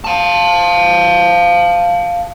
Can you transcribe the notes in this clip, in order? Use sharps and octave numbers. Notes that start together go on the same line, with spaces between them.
F5 A5